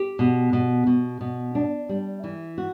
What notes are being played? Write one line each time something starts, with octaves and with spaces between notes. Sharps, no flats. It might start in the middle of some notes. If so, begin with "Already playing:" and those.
Already playing: G4
B2
B2
B2
B2
D4
G3
E3
F#4